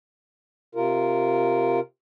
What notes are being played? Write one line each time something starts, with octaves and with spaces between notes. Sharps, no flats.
C3 F4 A#4